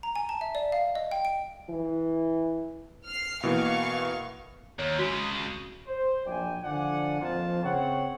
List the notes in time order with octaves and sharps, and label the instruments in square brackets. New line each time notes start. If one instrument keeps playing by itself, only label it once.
[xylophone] A#5
G#5
A5
E5
D5
F5
D#5
G5
D7
[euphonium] E3
[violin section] F6 C7
[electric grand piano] B2 E3 A#3 [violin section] F5 C#6
[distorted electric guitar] D#2 [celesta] C#5
[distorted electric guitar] C#3 G#3 [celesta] F#4 B6
[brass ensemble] C5
A#1 F#2 D5 G5 G#5
D3 F3 D5 F#5 G#5
F2 F3 A#3 F4 A5
C#3 C4 C#5 F#5